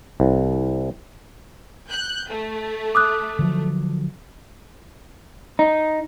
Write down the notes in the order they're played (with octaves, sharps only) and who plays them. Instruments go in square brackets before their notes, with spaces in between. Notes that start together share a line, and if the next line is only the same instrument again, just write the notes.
[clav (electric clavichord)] C2
[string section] F#6 G6
A3
[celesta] D6 D#6 F#6
[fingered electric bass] D3 F3 F#3
[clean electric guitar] D#4